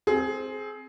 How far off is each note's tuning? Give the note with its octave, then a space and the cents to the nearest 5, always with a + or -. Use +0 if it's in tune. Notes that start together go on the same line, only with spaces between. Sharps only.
C4 +0 G#4 +20